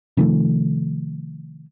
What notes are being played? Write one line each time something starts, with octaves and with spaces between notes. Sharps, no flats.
C3 D#3 F3 A3